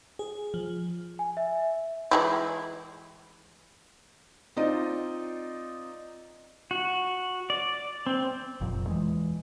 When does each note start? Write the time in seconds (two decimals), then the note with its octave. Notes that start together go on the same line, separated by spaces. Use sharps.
0.19 G#4
0.54 F3
1.19 G#5
1.37 E5
2.11 E3 G#3 E4
4.56 C4 D#4 F4 D5 D#5
6.71 F#4
7.50 D5
8.07 C4
8.60 F1 F2 A#2 F#3
8.87 E2 E3 G#3